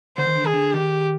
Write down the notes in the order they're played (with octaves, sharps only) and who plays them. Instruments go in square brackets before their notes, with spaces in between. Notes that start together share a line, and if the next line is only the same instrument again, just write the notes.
[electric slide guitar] D3 [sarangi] C5
[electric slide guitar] D#3
D3
[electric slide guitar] D#3 [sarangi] G#4
[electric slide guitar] D3
[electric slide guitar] D#3 [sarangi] G4